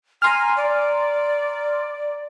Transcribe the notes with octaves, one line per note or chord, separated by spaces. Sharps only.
G#5 A#5 C6 F6
D5